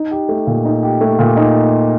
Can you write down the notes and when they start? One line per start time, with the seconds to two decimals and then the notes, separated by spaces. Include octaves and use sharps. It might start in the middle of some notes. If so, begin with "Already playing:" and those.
Already playing: D#4
0.11 G4
0.29 A3
0.47 A#2
0.65 D#4
0.83 G4
1.01 A3
1.19 A#2
1.37 D#4